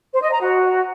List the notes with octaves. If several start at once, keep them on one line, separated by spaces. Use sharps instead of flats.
C5
D#5
A#5
F#4